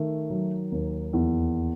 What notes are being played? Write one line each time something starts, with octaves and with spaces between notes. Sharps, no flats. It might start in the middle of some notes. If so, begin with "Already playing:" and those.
Already playing: D#3 A3
F#3
D#2
E2